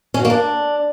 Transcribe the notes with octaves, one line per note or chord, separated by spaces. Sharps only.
C#4
F#4
A#3
D4